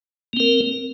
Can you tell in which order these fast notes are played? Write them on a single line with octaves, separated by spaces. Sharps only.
A#3 C4 A#4